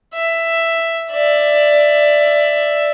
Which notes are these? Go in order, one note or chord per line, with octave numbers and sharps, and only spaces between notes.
E5
D5 E5